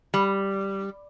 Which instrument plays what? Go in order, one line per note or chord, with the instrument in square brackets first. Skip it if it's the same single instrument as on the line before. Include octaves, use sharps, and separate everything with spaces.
[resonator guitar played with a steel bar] G3